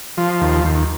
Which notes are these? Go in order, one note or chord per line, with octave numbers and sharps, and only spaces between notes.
F3
D#2
D#2